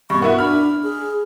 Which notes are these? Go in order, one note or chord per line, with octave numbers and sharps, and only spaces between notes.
G2 B2 C#6
B3 E4 F#4 A#4
D4 B5 F6
G#4